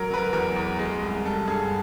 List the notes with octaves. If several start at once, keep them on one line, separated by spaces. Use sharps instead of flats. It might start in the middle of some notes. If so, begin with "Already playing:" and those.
Already playing: F#3 A#4
F#3 B4
A#4
E2 A#4
E2
G#3
C2
G3 A4
G2 G#4